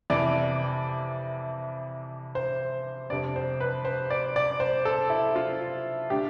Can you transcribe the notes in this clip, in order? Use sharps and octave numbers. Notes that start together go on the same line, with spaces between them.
F2 C3 E3 D5
C5
F2 C3 G3 D4 D5
C5
B4
C5
D5
D5
C5
A4
E4
F4
D3 A3 D4 G4